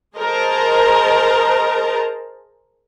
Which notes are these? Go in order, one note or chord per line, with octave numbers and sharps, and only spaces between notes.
G#4 A#4 C5 D#5 A5 A#5